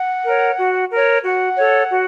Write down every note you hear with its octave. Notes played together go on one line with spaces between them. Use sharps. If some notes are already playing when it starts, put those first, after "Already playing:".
Already playing: F#5
A#4 C#5
F#4
A#4 C#5
F#4 F#5
A4 C#5
F#4